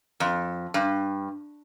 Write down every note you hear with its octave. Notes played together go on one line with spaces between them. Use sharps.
F2
G2